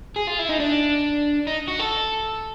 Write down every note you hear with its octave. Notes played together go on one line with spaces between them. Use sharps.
G#4
F4
E4
D#4
D4
D#4
F#4
A4